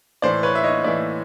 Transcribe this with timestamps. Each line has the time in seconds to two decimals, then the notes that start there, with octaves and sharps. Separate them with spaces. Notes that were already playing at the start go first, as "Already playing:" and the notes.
0.22 A2 E3 C5 D5
0.43 B4 C#5
0.55 E5
0.64 C#5 D#5
0.84 A2 E3 D5 E5